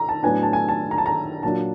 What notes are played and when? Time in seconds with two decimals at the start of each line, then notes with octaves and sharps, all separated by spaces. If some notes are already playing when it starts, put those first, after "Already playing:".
Already playing: A#5
0.09 A5
0.23 A2 F#3 B3 D4 G#5
0.43 A5
0.53 G#5
0.69 A5
0.91 A#5
0.98 A5
1.06 A#5
1.43 A#2 F#3 A#3 D4 A5